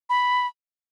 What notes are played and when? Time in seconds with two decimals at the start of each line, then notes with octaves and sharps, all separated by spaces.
0.10 B5